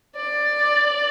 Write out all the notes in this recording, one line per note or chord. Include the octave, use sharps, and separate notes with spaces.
D5